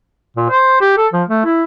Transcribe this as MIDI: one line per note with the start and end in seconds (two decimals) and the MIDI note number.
0.37 0.47 46
0.49 0.77 72
0.81 0.93 67
0.97 1.07 69
1.13 1.23 53
1.29 1.42 57
1.45 1.63 64